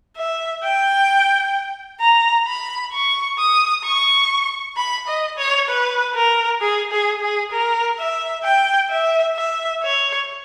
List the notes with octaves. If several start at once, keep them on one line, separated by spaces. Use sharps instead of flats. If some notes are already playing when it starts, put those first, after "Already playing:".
E5
G5
A#5
B5
C#6
D#6
C#6
B5
D#5
C#5
B4
A#4
G#4
G#4
G#4
A#4
E5
G5
E5
E5
C#5